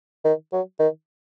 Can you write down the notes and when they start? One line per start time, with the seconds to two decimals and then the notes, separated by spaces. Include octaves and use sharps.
0.25 D#3
0.53 F#3
0.79 D#3